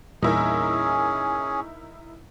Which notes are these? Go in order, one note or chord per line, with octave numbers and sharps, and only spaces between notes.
E2 A#2 G3 C#4 D#4 E4 G#4 A#4